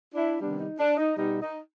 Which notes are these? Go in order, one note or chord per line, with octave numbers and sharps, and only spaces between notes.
D4 E4
C3 D#3 G3 B3 D4
D#4
D4
D#4
B2 G3 B3 D#4
D#4